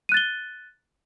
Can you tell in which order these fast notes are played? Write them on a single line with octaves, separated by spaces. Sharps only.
D#7 F#6 A6 G7